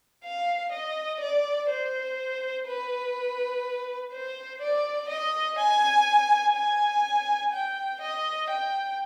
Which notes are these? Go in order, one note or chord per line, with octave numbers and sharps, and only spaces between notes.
F5
D#5
D5
C5
B4
C5
D5
D#5
G#5
G#5
G5
D#5
G5